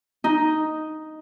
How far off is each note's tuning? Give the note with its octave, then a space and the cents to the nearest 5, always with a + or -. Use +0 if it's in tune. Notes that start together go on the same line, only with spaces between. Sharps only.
D#4 +0